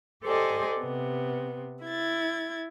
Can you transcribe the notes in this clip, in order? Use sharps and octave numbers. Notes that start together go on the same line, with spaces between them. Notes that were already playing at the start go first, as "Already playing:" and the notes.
G4 A4 C5 D5 D#5 G#5
C3 B3
E4 G#6 A6